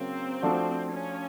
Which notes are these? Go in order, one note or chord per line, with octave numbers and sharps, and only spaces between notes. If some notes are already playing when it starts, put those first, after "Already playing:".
Already playing: C#3 F#3 A#3 C4
F3 A3 D4 F#4
C#4